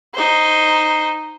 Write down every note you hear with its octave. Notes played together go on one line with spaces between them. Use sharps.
D#4 C5